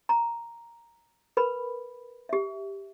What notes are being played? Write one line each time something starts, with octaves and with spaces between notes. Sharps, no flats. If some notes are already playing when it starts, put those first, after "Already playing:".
A#5
A#4 B4 B5
G4 E5